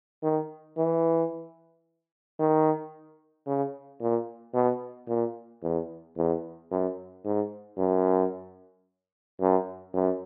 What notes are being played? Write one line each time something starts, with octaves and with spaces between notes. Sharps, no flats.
D#3
E3
D#3
C#3
A#2
B2
A#2
E2
E2
F#2
G#2
F#2
F#2
F#2